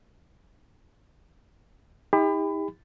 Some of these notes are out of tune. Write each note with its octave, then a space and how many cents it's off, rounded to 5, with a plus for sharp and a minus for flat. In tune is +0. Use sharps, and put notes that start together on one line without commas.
D#4 +40 G4 +40 B5 +25